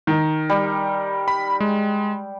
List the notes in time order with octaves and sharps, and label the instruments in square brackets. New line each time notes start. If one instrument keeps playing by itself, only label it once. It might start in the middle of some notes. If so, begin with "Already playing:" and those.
[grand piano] D#3
[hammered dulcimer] G3
[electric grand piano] B5
G#3